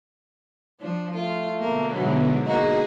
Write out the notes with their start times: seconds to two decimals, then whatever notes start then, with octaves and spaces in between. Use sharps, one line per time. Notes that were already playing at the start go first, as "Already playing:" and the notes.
0.80 F3 D4
1.15 A3 F4
1.60 B2 D3 A#3
1.94 G#2 E3 F#3
2.47 A#3 D#4 F#4 G#4